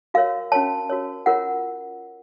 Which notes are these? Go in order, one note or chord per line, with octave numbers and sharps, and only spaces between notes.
F#4 A#4 C#5 F5
C#4 F#4 A#4 C#5 A5
F#4 A#4 C#5
F4 A#4 C#5 F#5